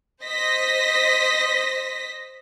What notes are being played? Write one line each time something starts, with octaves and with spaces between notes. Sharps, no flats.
C5 D#5 A#6 B6